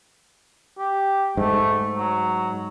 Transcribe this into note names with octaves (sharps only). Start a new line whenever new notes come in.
G4
G#2 A3
F#3